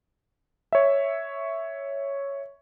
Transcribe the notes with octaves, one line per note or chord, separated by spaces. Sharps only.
C#5 E5